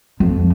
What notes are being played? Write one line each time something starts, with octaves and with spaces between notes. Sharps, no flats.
F2